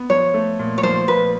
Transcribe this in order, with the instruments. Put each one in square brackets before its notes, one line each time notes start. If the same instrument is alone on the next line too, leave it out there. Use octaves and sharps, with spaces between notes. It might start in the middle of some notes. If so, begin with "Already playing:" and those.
Already playing: [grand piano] B3
[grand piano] F3 [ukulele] C#5
[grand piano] A3
A#2
[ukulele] C#5
[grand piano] F3 [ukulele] C5
[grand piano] A#2 [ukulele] B4